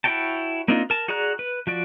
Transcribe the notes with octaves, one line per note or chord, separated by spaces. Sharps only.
E4 F#4 C#5 G5 A5
A#3 C4 D4 D#4 F4
A#4 A5
F#4 G#4 D5 A#5 F#6
B4
F3 F#4 D5